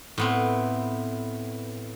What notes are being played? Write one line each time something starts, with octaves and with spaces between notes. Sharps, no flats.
A2 B3 C4